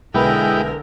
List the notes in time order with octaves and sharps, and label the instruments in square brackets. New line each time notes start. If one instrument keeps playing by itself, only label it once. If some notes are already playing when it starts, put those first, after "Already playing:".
[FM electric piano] B1 B3 [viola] D3 A#4 [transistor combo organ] G#3 E4 G5